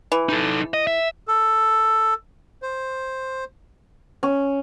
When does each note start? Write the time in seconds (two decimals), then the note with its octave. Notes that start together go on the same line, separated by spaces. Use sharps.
0.12 E3
0.29 D#4 A4
0.74 D#5
0.87 E5
1.28 A4
2.62 C5
4.23 C#4